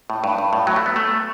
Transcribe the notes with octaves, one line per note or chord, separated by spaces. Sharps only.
A2
G2
G2
A2
F#3
A3
B3
A3